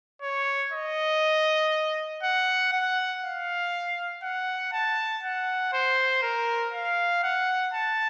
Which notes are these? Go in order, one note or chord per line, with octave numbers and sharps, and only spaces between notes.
C#5
D#5
F#5
F#5
F5
F#5
A5
F#5
C5
A#4
F5
F#5
A5